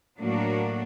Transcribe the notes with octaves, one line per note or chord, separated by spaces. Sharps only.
A2 F#3 A#3 D4 F#4